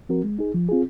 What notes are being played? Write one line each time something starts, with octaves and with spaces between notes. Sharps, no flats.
F3 C4 F#4 A#4
G#3
D#4 G#4
F3
C4 F4 G#4